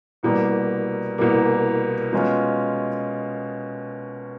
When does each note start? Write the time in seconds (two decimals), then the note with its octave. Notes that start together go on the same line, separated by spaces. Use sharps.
0.23 C2 B2 G3 A#3
1.18 C2 B2 G3 A#3
2.13 B2 G#3 C#4 F4